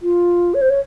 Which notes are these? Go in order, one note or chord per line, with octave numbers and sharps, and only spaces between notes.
F4
C#5
C5
C#5